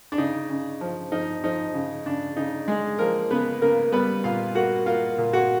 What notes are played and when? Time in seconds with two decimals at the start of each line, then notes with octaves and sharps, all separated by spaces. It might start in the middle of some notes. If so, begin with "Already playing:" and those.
0.12 D4
0.18 C#3 D#4
0.50 C#3
0.81 F3
1.12 F3 D#4
1.44 F3 D#4
1.74 C#3
2.06 C#3 D4
2.36 C#3 D#4
2.68 G#3 G#4
2.99 F3 A#3 A#4
3.31 C#3 B3 B4
3.61 C#3 A#3 A#4
3.92 G3 B3 B4
4.24 A#2 F4 F5
4.55 A#3 F#4 F#5
4.86 A#3 F4 F5
5.18 A#2
5.33 F#4 F#5